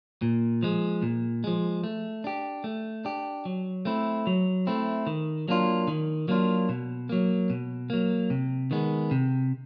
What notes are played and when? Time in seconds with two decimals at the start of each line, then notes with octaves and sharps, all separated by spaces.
0.22 A#2
0.63 F3 G#3
1.02 A#2
1.44 F3 G#3
1.84 A3
2.24 D4 G4
2.64 A3
3.05 D4 G4
3.45 F#3
3.85 A3 C4 E4
4.27 F#3
4.67 A3 C4 E4
5.07 D#3
5.48 F#3 A#3 D4 F4
5.88 D#3
6.28 F#3 A#3 D4 F4
6.69 B2
7.09 F#3 A#3
7.50 B2
7.90 F#3 A#3
8.30 C3
8.71 D#3 G#3 B3
9.11 C3